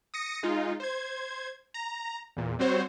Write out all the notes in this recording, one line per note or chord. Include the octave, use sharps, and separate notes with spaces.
D#6 A#6 C#7
G#3 D#4 F4
C5 G#6
A#5
E2 A#2
G3 C4 F#4 C5 C#5